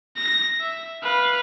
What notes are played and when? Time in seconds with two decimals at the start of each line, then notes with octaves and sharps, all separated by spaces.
0.17 A#6
0.60 E5
1.03 B4 F5